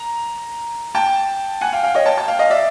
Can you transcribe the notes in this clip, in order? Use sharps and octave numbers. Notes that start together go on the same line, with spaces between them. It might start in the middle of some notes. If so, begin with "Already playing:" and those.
Already playing: A#5
G5 A5
F#5 G#5
F5 G5
F5 G5
C#5 D#5
G5 A5
G5 A5
F5 G5
D#5 F5
D5 E5